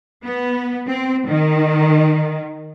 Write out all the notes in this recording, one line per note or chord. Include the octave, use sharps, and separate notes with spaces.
B3
C4
D#3